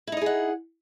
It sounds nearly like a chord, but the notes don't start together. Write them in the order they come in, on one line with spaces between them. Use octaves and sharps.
E4 D#4 D#5 G#4 F#5